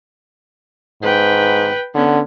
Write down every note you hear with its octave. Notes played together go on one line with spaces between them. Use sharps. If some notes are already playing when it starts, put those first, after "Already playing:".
G#2 B4 G5
D3 B3 C#4